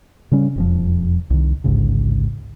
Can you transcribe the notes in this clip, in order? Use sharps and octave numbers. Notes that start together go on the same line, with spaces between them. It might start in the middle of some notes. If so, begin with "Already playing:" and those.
C#3 G3 C#4
E1 F2 F3
C2 D#3
A1 D2 G#2 C#3